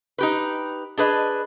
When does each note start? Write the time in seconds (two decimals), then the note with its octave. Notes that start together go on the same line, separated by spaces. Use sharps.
0.18 D#4 G4 B4
0.98 D4 G#4 B4 D#5